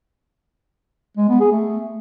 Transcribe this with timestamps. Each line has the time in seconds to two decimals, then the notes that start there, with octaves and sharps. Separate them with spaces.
1.17 G#3
1.29 B3
1.40 G#4
1.52 A3